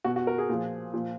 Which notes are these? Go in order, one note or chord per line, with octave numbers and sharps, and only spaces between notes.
B2 F#4
F#4
A#4
G#4
A#2 F3
A#2 F3